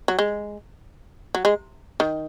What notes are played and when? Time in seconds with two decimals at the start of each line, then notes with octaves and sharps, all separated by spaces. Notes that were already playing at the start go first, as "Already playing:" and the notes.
0.08 F#3
0.19 G#3
1.35 F#3
1.45 G#3
2.00 D#3